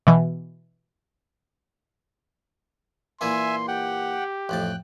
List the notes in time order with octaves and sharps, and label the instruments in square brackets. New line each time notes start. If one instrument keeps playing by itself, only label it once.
[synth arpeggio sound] B2 E3
[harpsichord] A#2 E3 A#3 [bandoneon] E5 G#5 [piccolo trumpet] C6
[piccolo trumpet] G4 [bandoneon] F#5 G5
[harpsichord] A1 F2 A5 [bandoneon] G5 F#6